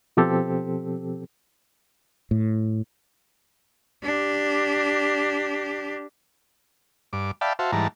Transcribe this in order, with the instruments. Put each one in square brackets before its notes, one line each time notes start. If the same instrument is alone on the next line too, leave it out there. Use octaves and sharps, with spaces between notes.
[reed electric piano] B2 F3 C4 G4 A4
[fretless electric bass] A2
[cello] D4 G4
[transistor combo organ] G2 D6
D5 E5 F5 G5 A5 B5
F#4 C5 E5 F5 A5
G#2 E3 G3 A5 A#5